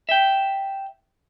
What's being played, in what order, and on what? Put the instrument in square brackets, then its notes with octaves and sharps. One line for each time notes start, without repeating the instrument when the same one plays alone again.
[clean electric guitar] E5 G5